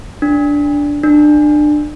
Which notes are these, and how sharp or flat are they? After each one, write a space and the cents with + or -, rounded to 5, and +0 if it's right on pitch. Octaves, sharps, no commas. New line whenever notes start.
D4 -10
D4 +25